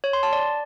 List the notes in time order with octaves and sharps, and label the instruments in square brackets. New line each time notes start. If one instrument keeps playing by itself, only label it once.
[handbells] C#5
C6
A5
D5